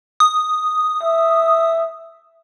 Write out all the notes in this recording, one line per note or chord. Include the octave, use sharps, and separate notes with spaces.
D#6
E5